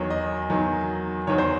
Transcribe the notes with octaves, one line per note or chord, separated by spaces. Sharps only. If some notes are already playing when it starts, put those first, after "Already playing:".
Already playing: E2 D#3 F#3 C#5
D#5
E2 D#3 F#3
E2 D#3 F#3 C#5
C5